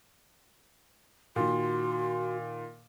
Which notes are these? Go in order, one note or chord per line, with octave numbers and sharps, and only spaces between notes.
A#2 D#3 F#4 C6